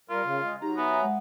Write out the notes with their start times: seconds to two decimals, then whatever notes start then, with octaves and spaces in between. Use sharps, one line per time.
0.10 G3 F4 A#4
0.24 C#3
0.42 G#3
0.62 F#3 D#4 G4 A#5
0.77 B3 E5 G#5
1.01 G#3 F#5